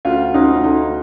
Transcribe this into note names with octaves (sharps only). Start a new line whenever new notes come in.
D2 F4
D2 D#4
D2 D#4